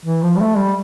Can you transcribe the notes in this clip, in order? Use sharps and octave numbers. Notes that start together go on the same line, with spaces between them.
E3
F3
G3
A3
G3